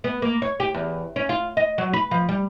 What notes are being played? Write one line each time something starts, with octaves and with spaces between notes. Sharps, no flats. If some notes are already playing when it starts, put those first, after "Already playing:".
B3
A#3
C#5
G4
E2
C#4
F4
D#5
F#3
B4
F3
G3